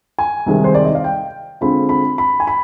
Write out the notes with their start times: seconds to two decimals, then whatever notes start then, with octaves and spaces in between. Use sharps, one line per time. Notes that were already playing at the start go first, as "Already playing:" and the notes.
0.19 G#5
0.46 C2 C3 D#3 G#3 C4
0.64 C5
0.74 D5
0.85 D#5
0.95 F5
1.04 G5
1.61 D3 G#3 C4 F4 B5
1.89 B5
2.18 B5
2.40 G#5
2.47 B5